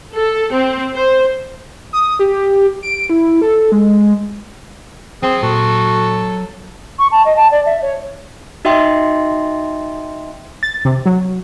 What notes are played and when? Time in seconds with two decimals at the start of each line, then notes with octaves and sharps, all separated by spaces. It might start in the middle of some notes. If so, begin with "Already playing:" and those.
0.13 A4
0.51 C4
0.95 C5
1.93 D#6
2.19 G4
2.83 D7
3.10 E4
3.42 A4
3.72 G#3
5.23 F#3 C4 G#4 C6
5.43 A#2 F#4 A4
6.98 C#6
7.11 A5
7.24 D#5
7.36 A5
7.51 D5
7.65 E5
7.81 C#5
8.65 D#4 F#4 D#5 E5 G5 C6
10.63 A6
10.85 C3
11.06 F#3